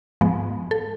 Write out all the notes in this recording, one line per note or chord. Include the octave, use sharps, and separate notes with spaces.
G#2 F3 G#3 B3
A4